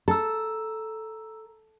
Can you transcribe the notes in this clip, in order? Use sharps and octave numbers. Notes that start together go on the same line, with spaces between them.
A4 A#5 E6